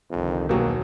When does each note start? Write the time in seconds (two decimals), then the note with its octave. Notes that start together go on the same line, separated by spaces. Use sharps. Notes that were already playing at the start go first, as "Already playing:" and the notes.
0.11 C2 F2 D3 D#3
0.49 E1 D#2 B2 F#3 A#3